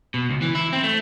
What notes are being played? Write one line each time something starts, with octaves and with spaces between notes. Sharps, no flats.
B2
C#2
E3
E4
C4
A3